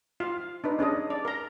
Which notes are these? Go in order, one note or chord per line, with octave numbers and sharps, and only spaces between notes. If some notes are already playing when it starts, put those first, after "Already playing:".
F4 F5
D4 D#4 B4
C#4 D4 G#4 D#5
D5
A#4 A#5